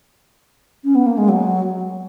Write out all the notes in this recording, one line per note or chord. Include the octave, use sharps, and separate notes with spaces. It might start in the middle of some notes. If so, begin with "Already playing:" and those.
C#4
B3
A#3
G#3
F#3